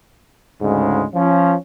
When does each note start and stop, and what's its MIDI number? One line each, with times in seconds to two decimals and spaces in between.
0.62 1.05 38
0.62 1.05 44
0.62 1.05 49
0.62 1.05 56
1.15 1.55 53
1.15 1.55 61